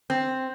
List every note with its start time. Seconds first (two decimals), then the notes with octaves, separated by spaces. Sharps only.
0.10 C4